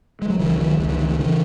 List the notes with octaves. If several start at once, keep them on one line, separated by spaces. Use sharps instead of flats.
G#3
F#3
C#2 C#3 E3
D#3 F#3
C#2 C#3 E3
D#3
E3
D#3
C#3 E3